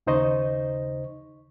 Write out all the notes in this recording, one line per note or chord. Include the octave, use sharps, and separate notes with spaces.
D#2 C#3 D#4 C5 D#5 C#6